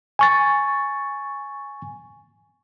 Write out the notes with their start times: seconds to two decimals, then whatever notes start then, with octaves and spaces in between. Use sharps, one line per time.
0.19 G#5 C#6 A6